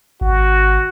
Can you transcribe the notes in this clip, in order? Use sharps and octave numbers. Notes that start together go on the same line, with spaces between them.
G#1 F#4